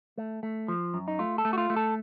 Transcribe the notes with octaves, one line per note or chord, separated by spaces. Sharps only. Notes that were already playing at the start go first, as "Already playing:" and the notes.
A3
A3
F3
F#2
D#4
A3 F4
A4
A3
F#4
F4
A3
A4